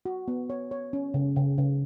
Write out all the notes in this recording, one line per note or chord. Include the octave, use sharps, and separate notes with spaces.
F#4
B3
C#5
C#5
C#4
C#3
C#3
C#3